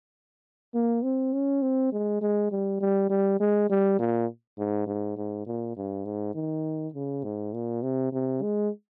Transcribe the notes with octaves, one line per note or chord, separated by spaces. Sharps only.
A#3
C4
C#4
C4
G#3
G#3
G3
G3
G3
G#3
G3
A#2
G#2
G#2
G#2
A#2
G2
G#2
D#3
C#3
G#2
A#2
C3
C3
G#3